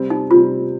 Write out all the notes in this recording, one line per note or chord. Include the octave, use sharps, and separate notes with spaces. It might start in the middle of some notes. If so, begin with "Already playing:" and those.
Already playing: C3 G3 C4
D#4
C3 G3 C4 F4